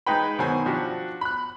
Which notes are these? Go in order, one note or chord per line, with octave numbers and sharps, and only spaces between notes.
G#3 D#4 B4 G5 B5
B2 D#3 F#3 C5 G#5
F3 D4 F#4 G4
B5 F#6